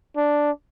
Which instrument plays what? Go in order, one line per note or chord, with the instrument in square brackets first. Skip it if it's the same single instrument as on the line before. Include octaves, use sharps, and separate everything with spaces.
[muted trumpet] D4